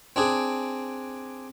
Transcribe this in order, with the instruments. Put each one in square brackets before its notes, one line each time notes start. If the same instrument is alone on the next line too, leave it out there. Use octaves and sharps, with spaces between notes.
[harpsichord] C4 D4 G#4